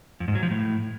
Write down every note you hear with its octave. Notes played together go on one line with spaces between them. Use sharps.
F2
G#2
F#3
F3
A2